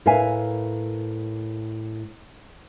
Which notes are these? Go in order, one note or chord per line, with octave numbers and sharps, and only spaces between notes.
A2 A#4 B4 E5 F5 G#5